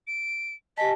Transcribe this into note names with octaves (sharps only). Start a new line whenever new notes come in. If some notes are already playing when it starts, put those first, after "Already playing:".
D7
G4 D#5 G#5 A5 B6